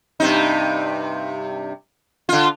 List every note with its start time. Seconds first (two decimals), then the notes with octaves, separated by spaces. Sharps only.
0.20 G2 C3 D#4
2.29 D3 F4